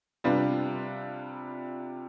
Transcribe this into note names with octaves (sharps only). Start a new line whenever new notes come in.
C3 G3 D4 F4 B4